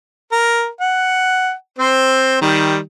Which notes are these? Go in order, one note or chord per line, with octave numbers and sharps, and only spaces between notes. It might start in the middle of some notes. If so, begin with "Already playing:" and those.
A#4
F#5
C4 C5
D#3 G3